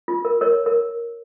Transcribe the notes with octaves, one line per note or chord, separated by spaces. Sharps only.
F4
A#4
A#4 C#5
A#4